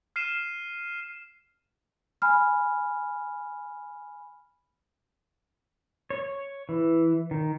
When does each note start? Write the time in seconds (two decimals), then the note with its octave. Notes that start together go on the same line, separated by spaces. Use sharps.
0.16 F6 C7 D#7 E7
2.22 G#5 B5 F6
6.10 C#5
6.69 E3
7.31 D#3